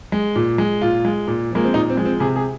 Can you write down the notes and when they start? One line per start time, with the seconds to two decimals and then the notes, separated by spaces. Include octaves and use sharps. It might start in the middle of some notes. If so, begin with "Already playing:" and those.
0.12 G#3
0.35 A#2
0.58 G#3
0.82 A#2 F4
1.05 G#3
1.27 A#2
1.51 F3 G#3 A#3
1.64 C4
1.74 A#2 D#4
1.90 C4
1.97 F3 G#3
2.06 C4
2.20 C3 G#4
2.36 G#4